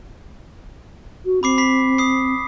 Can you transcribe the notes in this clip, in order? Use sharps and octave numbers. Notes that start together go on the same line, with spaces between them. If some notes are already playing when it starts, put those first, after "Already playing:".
F#4
C4 B5 D6 C7
B5 B6 C7
D#6 C7